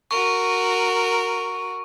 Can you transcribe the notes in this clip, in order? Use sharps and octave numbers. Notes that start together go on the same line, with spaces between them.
F#4 A#4 C#6